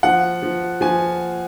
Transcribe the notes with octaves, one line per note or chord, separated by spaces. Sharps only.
F3 F#5
F3
F3 G#5